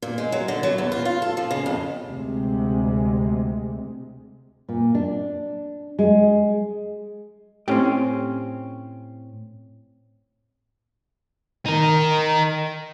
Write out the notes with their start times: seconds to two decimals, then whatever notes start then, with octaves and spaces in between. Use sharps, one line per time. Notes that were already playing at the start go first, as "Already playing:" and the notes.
0.02 A#2
0.18 G#3
0.32 F#3
0.48 D3
0.63 F#3
0.78 E2
0.92 F4
1.05 F4
1.22 A4
1.37 F3
1.51 C#3
1.66 F2
2.04 D2 C3 G#3
4.69 A#2
4.95 D4
5.99 G#3
7.68 A2 C4 C#4 G4
11.66 D#4 A#4